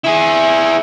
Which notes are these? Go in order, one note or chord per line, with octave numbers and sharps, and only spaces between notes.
E4 G#4